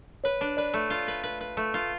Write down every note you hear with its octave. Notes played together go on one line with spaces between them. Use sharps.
B4 C#5
D4
B4 D5
A3
F4
B4
B4
B4
A3
F4